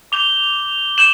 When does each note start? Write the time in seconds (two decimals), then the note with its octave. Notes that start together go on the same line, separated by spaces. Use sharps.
0.12 D6 G6 F7 G7
0.98 D6 G6 E7 F#7